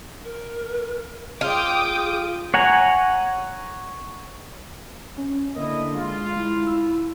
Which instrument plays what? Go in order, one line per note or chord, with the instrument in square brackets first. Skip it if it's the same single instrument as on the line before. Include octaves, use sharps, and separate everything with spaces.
[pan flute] A#4
[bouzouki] F4 [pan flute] G#4 [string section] G5 D6 D#6
[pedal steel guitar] C#5 F#5 G#5 A#5
[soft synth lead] C#4
[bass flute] D3 [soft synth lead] A#3 [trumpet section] E4 D#5
[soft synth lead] G#3 [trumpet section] F4
[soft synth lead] G#3 [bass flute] E4
[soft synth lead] E6